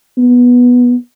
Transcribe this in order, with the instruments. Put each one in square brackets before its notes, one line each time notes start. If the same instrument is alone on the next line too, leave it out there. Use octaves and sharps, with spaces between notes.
[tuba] B3